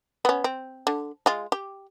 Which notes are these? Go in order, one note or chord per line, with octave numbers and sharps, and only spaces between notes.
B3 C#4
C4
D3
G#3 F4
G4